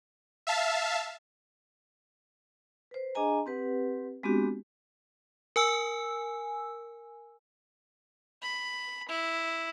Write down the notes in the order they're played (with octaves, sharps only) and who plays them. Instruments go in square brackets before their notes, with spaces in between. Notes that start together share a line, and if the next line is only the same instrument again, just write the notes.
[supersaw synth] E5 F5 A5
[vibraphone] B4 C5
D4 G#4 D#5 G#5 A#5
C4 G4 B4 F#5
G#3 B3 C4 D4 F#4 G4
[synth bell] A#4 G#5 E6
[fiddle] B5
E4